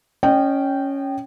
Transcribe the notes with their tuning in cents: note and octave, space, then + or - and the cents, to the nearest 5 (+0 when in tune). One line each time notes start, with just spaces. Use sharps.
C#4 +0 D#5 -35 G5 -10